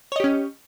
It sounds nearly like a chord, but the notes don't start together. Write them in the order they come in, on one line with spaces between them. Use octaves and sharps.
C#5 D#5 G4 C#4